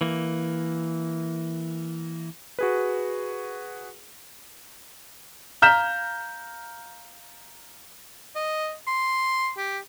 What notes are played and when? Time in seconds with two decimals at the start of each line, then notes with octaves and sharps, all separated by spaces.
0.01 E3 A#3
2.59 F#4 G#4 B4
5.62 F5 A#5 F6 G6 B6 E7
8.36 D#5
8.87 C6
9.58 G4